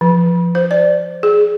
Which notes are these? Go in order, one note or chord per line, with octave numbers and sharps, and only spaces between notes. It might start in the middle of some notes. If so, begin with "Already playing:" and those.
F3
C5
D5
G#4